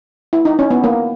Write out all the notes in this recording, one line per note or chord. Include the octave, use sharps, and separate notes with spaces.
E4
D#4
C#4
B3
A#3